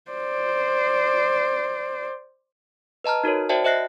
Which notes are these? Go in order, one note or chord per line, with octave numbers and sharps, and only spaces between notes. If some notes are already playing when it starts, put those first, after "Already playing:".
C5 D5
B4 D#5 A5 A#5 F6
D#4 F#4 A#4 C#5
F#4 C5 D5 E5 G5 A5
C5 D#5 E5 F#6 A#6 C7